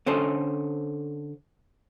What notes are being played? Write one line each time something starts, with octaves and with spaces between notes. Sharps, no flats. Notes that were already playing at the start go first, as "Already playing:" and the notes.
D3 C#4 A4 C5